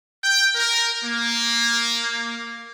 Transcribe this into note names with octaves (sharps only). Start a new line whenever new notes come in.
G5
A#4
A#3